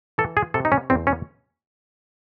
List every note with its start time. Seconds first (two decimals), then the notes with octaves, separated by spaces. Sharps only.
0.18 E3 A4
0.37 G#4
0.54 C3 A4
0.65 D#4
0.72 C#4
0.90 E2 C4
1.07 C#4